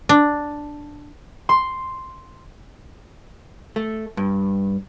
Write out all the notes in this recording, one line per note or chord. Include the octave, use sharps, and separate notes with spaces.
D4
C6
A3
G2